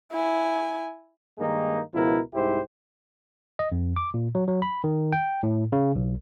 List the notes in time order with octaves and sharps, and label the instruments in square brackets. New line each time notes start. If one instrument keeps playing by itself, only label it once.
[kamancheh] E4 G#5
[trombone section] G2 D#3 G#3 A#3 D#4
C#2 B2 F3 E4 A#4
C2 G#2 E4 G4 C5
[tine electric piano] D#5
F2
D6
A#2
F#3
F#3
B5
D#3
G5
A2
C#3
B1